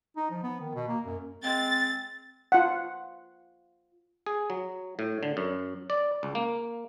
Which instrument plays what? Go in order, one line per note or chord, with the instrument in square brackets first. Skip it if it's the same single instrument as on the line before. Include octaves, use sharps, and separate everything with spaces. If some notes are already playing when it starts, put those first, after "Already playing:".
[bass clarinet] D#4
F3
B3
D#3
B2
A#3
F#2
[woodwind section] G#3 C4 [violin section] A6
[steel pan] F4 F#5
[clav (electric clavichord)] G#4
F#3
A2
D3
F#2
D5
C#2
A#3